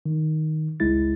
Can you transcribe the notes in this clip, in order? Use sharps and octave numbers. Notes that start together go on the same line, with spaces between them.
D#3
G1 C#2 G#3 E4 A6